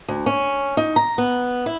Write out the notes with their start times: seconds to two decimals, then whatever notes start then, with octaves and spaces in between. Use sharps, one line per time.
0.08 D2
0.26 C#4
0.77 D#4
0.96 A#5
1.18 B3
1.66 E4